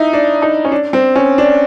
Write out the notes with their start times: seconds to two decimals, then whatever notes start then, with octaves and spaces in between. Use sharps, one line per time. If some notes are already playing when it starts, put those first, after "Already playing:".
Already playing: D#4 E4
0.13 D4
0.42 D#4
0.65 C#4
0.72 D4
0.93 C4
1.16 C#4
1.38 D4